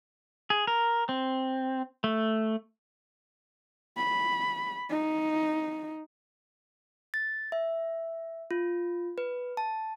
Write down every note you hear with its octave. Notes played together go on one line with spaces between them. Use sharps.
G#4
A#4
C4
A3
B5
D#4
A6
E5
F4
B4
A5